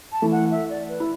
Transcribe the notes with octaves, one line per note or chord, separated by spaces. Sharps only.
A5
E3 A3
F#5
E5
D5
B4
E4